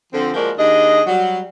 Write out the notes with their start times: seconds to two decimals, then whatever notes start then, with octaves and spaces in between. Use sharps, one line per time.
0.12 D3 F3 C4
0.34 F3 G#3 A#3 F#4 A#4 D5
0.57 D#2 D4 G#4 D#5
1.06 F#3 G3